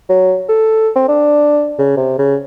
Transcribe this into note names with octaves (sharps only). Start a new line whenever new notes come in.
F#3
A4
C4
D4
C#3
C3
C#3